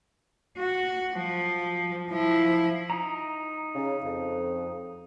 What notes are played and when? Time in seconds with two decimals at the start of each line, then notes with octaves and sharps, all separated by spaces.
0.58 F#4
1.13 F3
2.10 F3 E4
2.90 D#4 A#5
3.75 C#3
4.04 F2